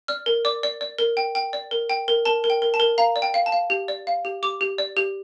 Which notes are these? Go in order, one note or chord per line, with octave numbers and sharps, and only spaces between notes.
D5 F6
A#4
D5 D6
D5
D5
A#4
G5
G5
D5
A#4
G5
A#4
A#4 A5
A#4
G5
A#4
A5
A#4
F5 A#5
D5
G5
F5
A5
F5
G4
D5
F5
G4
G4 D6
G4
D5
G4